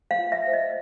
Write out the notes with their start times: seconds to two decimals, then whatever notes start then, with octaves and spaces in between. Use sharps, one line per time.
0.11 F5
0.18 F4
0.32 E5
0.47 C5
0.53 D#5